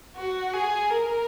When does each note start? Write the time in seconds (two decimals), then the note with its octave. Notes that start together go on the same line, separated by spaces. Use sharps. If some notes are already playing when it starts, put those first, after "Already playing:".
0.16 F#4
0.53 G#4
0.90 A#4